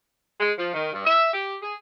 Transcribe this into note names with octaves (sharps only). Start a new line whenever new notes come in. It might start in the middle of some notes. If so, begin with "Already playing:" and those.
G#3
F3
D#3
G2
E5
G4
G#4